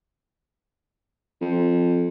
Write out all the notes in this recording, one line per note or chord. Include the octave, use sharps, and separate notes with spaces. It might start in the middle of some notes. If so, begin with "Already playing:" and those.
F2